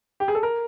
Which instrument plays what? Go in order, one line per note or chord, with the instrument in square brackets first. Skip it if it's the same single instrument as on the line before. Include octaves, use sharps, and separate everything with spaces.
[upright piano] G4
G#4
A4
A#4